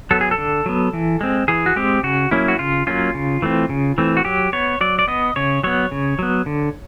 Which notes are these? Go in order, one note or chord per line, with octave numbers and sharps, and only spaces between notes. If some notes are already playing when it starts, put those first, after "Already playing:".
F#3 B3 A4
G#4
A4
D3
F#3 B3
E3
G#3 C4
E3 G#4
F#4
G#3 C4 G4
C#3 F#4
F#3 A#3 C#4 E4
F#4
C#3 F4
F#3 A#3 C#4 F4
C#3
E3 A3 C4
C#3
E3 A3 C4
F#4
F#3 G4
B3 C#5
F#3 D5
D5
B3 D#5
C#3 C#5
F#3 B3 C#5
C#3
F#3 B3
D3